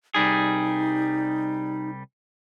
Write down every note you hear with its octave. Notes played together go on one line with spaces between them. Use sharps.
C2 G3 D#4 G#4